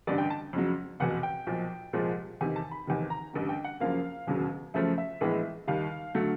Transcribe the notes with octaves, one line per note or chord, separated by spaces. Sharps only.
A1 G2 D3 D5
G5
A5
F2 C#3 F#3
F1 E2 B2 F#5
G5
B1 A#2 F3
C2 A#2 F3 G#3
E2 C3 D#3 G#5
A5
B5
F1 E2 C3 D#3
A#5
A1 G2 D3
G5
F#5
F#2 C#3 F3 A#3 F5
E1 D#2 C#3 F#3
F#2 C#3 F3 A3 E5
E5
A#1 A2 E3 G#3 B3
D#2 D#3 G3 F5
D3 F#3 A3